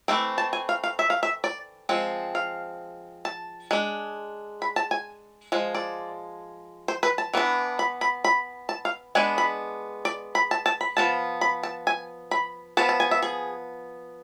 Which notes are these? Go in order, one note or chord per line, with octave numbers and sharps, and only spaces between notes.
E3 A3 C4
A5
G#5
F5
F5
E5
F5
E5
D5
F3 G#3 C4
F5
A5
G#3 D4
B5
A5
G#5
F3 G#3
D5
C5
B4
A5
E3 B3 D4
B5
B5
B5
A5
F5
G#3 B3 D4 G#5
B5
D5
B5
A5
A5
B5
F3 B3 A5
B5
A5
G#5
B5
F3 B3 A5
A5
G#5
E5
G#4